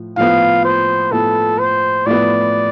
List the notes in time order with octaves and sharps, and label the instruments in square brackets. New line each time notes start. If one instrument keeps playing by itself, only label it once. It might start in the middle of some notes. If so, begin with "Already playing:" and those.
Already playing: [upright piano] A2 F3
[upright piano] A2 F3 B3 [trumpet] F5
[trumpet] C5
[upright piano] A2 F3 B3 [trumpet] A4
[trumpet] C5
[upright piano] A2 F3 B3 [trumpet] D5